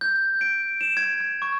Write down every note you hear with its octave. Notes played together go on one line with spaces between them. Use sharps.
G6
D7
E7
G#6
G#6
C#6